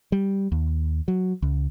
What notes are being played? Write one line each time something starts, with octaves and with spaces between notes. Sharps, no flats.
G3
D#2
F#3
C#2